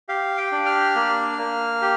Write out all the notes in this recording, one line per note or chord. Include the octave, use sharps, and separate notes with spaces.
G4 F5
G5
D4
F6
A#3
A#3
G4